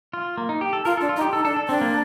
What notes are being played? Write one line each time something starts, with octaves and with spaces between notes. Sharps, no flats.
F4
A#3
D#4
G4
A4
F4 A#4
D4 A4
F4
D#4
G4
D#4 A4
D4 A4
A4
C4 D4
A#3